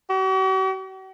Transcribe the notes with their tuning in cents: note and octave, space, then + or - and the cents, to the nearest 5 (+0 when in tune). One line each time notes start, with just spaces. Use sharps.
F#4 +45